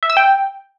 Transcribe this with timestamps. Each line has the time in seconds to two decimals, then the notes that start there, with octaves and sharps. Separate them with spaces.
0.03 E5
0.10 E6
0.17 G5